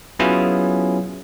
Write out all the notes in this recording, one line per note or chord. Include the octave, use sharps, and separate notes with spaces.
F#3 B3 C#4 E4 F4 G#4